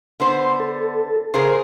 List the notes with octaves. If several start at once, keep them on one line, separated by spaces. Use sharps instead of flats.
D3 B3 C5
A4
C#3 G#4 A#4 C5 C6